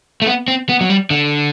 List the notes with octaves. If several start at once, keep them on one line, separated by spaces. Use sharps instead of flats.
A3
B3
C4
B3
F#3
G3
D3